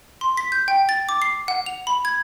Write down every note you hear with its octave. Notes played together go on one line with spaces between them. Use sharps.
C6
B6
G6
G5
A6
D6
C7
F#5
F7
B5
G#6